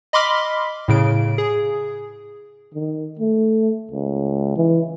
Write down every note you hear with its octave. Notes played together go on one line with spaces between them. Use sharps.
D#5 B5 C6 D6 F6 B6
A2 C#3 D7
G#4
D#3
A3
C#2
E3